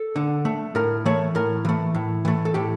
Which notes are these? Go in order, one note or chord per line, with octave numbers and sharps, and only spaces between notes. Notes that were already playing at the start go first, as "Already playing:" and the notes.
Already playing: A4
D3
A3
A2 A#4
E3 A3 C#5
A2 A#4
E3 A3
A2
E3 A3
A4
A2 G4